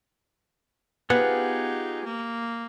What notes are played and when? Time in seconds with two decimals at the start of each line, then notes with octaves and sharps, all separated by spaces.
1.10 B3 D#4 F4 G4 G#4 F#5
2.05 A#3